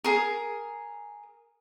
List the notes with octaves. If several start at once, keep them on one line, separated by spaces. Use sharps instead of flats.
G#4 A#4